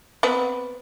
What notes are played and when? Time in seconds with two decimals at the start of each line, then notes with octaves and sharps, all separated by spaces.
0.23 B3 C4 B4